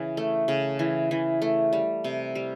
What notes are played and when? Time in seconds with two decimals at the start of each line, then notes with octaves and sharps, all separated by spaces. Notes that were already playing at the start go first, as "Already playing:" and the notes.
Already playing: C#3 E3
0.17 A3
0.48 C#3
0.79 E3
1.11 E3
1.42 A3
1.73 G3
2.04 C3
2.35 G3